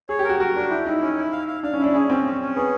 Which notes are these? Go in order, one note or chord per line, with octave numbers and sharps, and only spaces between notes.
G#4 C#5
G4
A#4
F#4
F#4 A#4
D4
E4 G4
D#4 E4
C#4
E4
F5
F5
D4 F5
C#4
D4 E4
C#4 G#4
C4 C#4
C#4
C#4
B3 G#4